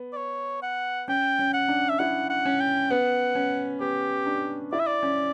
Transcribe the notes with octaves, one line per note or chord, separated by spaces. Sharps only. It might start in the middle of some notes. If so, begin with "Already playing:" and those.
Already playing: B3
D5
C#5
F#5
C#4 G5
C#4
F#5
D4
E5
E4 F#5
F#5
C#4
G5
B3 F#5
C#4
B3 G4
D4
E4 D5
E5
D5
C#4